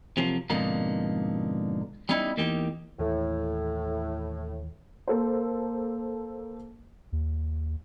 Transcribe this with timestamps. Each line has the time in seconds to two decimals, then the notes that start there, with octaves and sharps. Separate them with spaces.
0.17 C3 F3 F#3 A#3
0.50 F2 G#2 B2 D3 A#3 D#4
2.09 G3 B3 C#4 D#4 E4 D#5
2.37 E2 A#3 D#4 G4
2.99 D#2 A2 E3
5.07 A#3 A4 A#4 C5
7.12 D#2